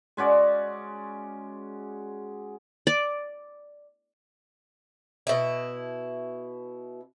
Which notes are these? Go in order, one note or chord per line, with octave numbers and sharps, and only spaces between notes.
G#3 C#4 F#4 D5
D5
B2 E4